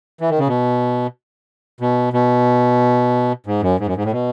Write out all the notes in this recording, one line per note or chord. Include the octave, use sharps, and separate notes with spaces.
E3
D#3
C#3
B2
B2
B2
G#2
F#2
G#2
F#2
G#2
A2
B2